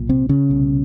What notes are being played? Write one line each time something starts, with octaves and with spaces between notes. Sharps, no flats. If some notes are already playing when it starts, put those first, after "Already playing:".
Already playing: B1 A#2
C3 C4
C#3 C#4
C2 B2